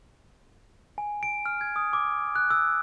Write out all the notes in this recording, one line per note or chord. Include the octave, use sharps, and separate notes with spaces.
G#5
D7
F6
G#6
D#6
D6
F#6
E6